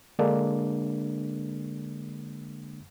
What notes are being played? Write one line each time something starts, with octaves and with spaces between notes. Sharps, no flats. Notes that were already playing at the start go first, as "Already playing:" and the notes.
D3 G#3 A#3 D4